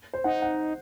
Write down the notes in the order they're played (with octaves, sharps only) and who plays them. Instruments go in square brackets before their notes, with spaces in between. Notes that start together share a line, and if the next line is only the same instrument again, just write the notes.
[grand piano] C5
[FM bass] D#4 [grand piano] F#5
[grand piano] F#5